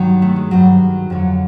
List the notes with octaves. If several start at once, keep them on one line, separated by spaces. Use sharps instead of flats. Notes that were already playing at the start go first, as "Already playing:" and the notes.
Already playing: G2 D#3 F#3
A3
G#3
G2 D#3 F#3
F2 D3 F#3